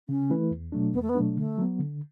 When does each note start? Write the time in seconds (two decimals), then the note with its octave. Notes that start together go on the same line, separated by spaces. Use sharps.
0.09 C#3 C#4
0.30 E3 A3 E4 B4
0.51 E2
0.72 B2 F#3 A3 D4
0.93 E2 B3
1.02 A3
1.09 B3
1.15 B2 F#3 A3 D4
1.37 D3 A3
1.58 F#3 B3
1.79 D3